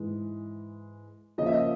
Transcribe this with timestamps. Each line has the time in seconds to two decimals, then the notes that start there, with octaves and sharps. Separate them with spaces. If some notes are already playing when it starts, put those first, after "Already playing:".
Already playing: G#2 E3 G#3
1.38 C#3 F3 A#3 C#4 D#5
1.46 E5
1.53 D#5